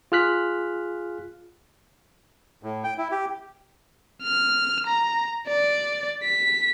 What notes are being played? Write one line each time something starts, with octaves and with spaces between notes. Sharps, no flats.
F4 G#4 F6 F#6 B6
A2
G5
E4
G4
F6
A#5
D5
B6